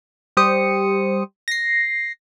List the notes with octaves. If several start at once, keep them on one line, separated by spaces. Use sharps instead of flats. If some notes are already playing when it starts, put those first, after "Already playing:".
G3 G4 C5 D#6 C#7
A#6 C7